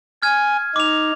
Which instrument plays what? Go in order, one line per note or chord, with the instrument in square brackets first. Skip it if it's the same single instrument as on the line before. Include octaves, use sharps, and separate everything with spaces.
[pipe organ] G#5 [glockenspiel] F6 G#6
[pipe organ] D#4 [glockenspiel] D6 F7